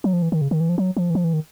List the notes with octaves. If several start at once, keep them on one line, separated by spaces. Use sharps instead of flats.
F#3
F3
E3
D#3
C#3
D#3
E3
F3
F#3
F3
E3
F3
E3
D#3